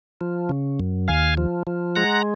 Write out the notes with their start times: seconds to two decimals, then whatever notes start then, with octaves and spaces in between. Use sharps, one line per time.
0.21 F3
0.49 C#3
0.80 F#2
1.08 D#2 F5 G#5
1.37 F3
1.67 F3
1.96 G#3 F#5 A#5